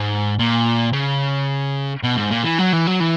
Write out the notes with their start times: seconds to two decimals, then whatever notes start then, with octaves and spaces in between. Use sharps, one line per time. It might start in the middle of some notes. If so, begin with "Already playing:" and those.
Already playing: G#2
0.39 A#2
0.93 C#3
2.03 B2
2.17 G#2
2.31 A#2
2.44 E3
2.59 F#3
2.73 E3
2.87 F#3
3.00 E3